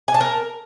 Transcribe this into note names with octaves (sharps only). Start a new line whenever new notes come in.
G#5
A5
A#4